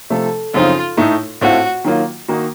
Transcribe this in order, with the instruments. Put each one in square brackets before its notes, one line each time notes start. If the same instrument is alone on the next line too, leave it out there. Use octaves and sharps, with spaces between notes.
[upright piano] C3 F3 A3 [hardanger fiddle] A4
[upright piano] F#2 C#3 F3 C4 D#4 [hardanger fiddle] F4
[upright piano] A2 A3 D#4
[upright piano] A2 A3 C4 F4 [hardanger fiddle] F#4
[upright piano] D#3 F#3 A#3 F4
D#3 A#3 D#4 F#4